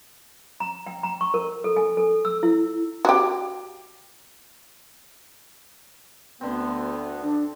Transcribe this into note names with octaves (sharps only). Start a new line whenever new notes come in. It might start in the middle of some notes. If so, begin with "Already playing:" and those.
A#5
G5
A#5
C#6
A#4
A4
G#5
A4
E6
E4
F#4 G4
D2 D3 B3 C4
D4